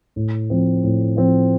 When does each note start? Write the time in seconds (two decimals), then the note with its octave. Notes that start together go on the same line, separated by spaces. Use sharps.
0.16 A2
0.50 F3 C4
0.84 A2
1.17 F3 C4